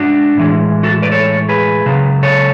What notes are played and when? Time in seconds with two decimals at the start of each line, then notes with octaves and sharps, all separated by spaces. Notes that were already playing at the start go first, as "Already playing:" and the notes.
Already playing: G#2 G#3 D4 F#4
0.37 A2 E3 G#3
0.83 F#4 A4
1.02 B4 D5
1.12 A4 C#5
1.49 G#4 B4
1.86 C#2 C#3 F#3
2.23 A4 C#5